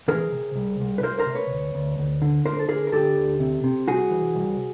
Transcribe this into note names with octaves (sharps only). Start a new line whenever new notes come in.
E3 G#4 A#4
C3
C2
C2
B4
C2 A#4 C5
A#4 C5
C3
B4 C#5
D2
D2
D2
D3
D3 A#4 C5
A4
D3 G#4 A#4
A#4
D3 G4 A4
D2
C3
C3
C2 F#4 G#4
E3
C2